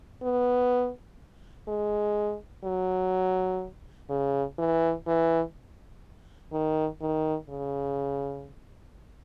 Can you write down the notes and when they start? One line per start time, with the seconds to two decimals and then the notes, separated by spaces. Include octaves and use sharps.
0.22 B3
1.68 G#3
2.64 F#3
4.10 C#3
4.58 E3
5.07 E3
6.53 D#3
7.01 D#3
7.49 C#3